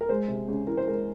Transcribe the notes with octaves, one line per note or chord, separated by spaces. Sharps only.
A#4
G#3 C5
C3
C#2
E3 A#4
C5
G#3 A#4